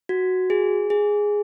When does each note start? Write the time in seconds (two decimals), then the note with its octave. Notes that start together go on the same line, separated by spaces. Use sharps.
0.09 F#4
0.50 G#4
0.90 G#4